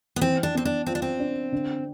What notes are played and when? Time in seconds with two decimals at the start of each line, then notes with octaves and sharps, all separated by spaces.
0.16 B3
0.21 E3 C4
0.43 D4
0.55 B3 C4
0.65 D4
0.86 C4 F4
0.95 D4
1.02 C4
1.20 D4
1.52 D3